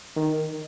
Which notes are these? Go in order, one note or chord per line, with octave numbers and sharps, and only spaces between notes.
D#3